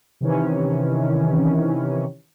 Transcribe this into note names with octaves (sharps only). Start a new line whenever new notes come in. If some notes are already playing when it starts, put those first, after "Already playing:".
C3 D#3 E3 C#4